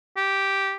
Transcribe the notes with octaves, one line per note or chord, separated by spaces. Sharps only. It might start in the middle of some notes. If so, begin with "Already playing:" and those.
G4